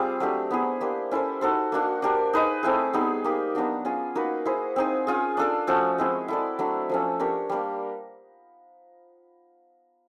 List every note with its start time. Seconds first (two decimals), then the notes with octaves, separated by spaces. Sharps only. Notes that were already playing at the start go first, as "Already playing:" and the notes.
Already playing: G3 C4 F4 G#4
0.20 F#3 A3 D4 G4
0.51 B3 E4 G#4
0.81 A#3 D4 G4 C5
1.11 C#4 E4 A4 C5
1.41 D#4 F#4 A4 C5
1.72 A#3 D4 F#4
2.02 D4 G4 A#4
2.33 D#4 G#4 B4 D#5
2.63 A3 C4 E4 G#4
2.93 G3 B3 D#4 G#4
3.24 A#3 D#4 G4
3.55 F#3 B3 D4 F#4
3.85 C#4 F4 G#4
4.15 A#3 D#4 F#4 B4
4.45 E4 G#4 C5
4.76 C4 D#4 G#4
5.07 C#4 F4 G#4
5.37 D4 F4 A4 D5
5.67 F3 A3 C#4 F#4
5.98 G#3 C4 E4 G#4
6.28 E4 A4 D5
6.59 F#3 A3 D4
6.89 F3 A3 C#4
7.20 D4 G4 A#4 C#5
7.49 G3 A#3 D4